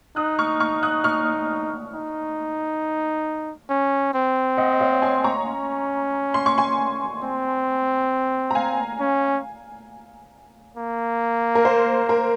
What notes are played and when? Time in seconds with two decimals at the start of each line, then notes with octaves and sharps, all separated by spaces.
0.16 D#4 D#6 F#6
0.39 C#6 F6
0.60 C#6 F6
0.83 D#6 F#6
1.04 C#6 F6
1.93 D#4
3.69 C#4
4.14 C4
4.58 D#5 F#5
4.80 C#5 F5
5.02 G#5 C6
5.24 A#5 C#6
5.46 C#4
6.34 C6
6.46 C#6
6.58 G#5 C6
7.23 C4
8.51 A#5
8.55 F5 G#5
9.00 C#4
10.77 A#3
11.55 A#4
11.65 C5
12.09 A#4